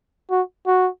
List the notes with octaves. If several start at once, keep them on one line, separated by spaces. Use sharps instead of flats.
F#4
F#4